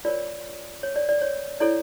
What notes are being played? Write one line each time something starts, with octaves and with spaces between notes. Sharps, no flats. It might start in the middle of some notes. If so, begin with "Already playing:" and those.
F4 A#4 C#5 D5
C#5
D5
D5
C#5
E4 A4 C#5 D5